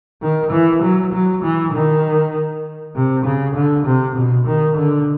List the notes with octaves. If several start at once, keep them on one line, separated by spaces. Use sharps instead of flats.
D#3
E3
F#3
F#3
E3
D#3
C3
C#3
D3
C3
B2
D#3
D3